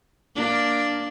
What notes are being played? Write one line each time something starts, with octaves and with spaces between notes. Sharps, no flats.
A#3 D4